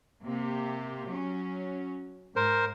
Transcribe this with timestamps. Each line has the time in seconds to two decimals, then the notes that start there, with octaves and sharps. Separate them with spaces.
0.23 C3 A#3 G4
1.09 F#3 C#4
2.36 G#2 A#4 C5